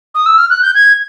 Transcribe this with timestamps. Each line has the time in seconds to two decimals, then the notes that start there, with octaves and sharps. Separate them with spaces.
0.15 D#6
0.26 E6
0.38 F6
0.50 F#6
0.62 G6
0.75 G#6